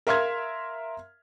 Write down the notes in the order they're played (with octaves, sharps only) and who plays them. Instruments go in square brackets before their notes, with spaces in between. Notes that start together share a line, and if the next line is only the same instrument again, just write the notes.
[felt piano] A#4 E5 F5 C6 F6 G#6